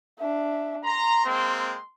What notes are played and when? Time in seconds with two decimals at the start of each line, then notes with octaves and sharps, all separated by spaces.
0.19 D4 E5
0.84 A#5 C6
1.25 G#3 A#3 C4